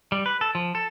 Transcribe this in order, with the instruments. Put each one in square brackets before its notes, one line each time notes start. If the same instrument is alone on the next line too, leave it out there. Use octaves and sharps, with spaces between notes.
[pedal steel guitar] G3
B4
A4
F3
A4